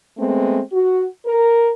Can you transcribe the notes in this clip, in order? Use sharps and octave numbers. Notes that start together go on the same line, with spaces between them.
G#3 A3 B3 C4
F#4
A#4